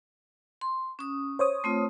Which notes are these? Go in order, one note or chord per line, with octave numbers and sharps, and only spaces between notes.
C6
C#4 D#6
C5 C#5 D#6
A3 C4 F4